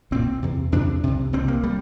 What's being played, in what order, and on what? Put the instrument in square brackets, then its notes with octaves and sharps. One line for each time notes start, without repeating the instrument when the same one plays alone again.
[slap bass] C2 A#2 C4
E2 C3
E2 C3 D4
C2 C3
C2 C3 C4
A#3
G3